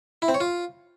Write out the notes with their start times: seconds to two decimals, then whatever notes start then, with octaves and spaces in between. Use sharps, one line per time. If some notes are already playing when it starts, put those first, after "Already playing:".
0.22 E4
0.28 C4
0.34 C#5
0.40 F4